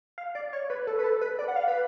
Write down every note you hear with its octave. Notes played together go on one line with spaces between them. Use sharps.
F5
D5
C#5
B4
A4
B4
A4
B4
D5
F#5
F5
B4